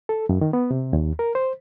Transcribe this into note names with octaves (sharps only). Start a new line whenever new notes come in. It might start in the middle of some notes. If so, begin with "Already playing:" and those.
A4
F#2
D#3
B3
C3
D#2
A#4
C5